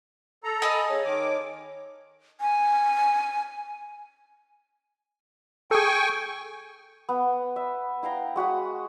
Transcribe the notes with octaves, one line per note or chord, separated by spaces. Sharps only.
A4 A#5
D#5 G#5 A5 B5
C#3 C#5
D#3 D6
G#5
G#4 A4 G5 G#5 C#6
B3
E5
E4 F5 G5 A#5
G#3 F#4 B5 D#6